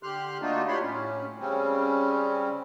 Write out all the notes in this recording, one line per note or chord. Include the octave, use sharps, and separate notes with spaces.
D3 G4 C6 F6 F#6
A3 A#3 D4 D#4 F4 F#4
D4 E4 G4 C#5 B5 C6
A2 C#4
C#3 G3 C4 C#4